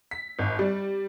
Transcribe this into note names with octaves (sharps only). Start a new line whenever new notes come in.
B6
G#1
G3